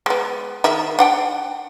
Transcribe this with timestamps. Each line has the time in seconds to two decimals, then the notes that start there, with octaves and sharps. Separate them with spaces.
0.06 G#3 B3
0.64 D#3 G#4 E5
0.99 D4 F#5 G5